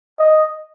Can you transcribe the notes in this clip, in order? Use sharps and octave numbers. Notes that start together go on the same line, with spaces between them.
D#5